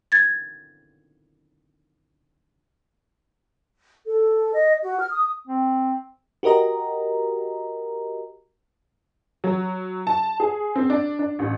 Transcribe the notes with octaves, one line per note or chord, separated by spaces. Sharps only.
G#6 A6
A4
D#5
F#4
F6
D#6
C4
F#4 G4 A#4 D#5 A#5
F#3
A5
G#4
C4
D4
D4
A1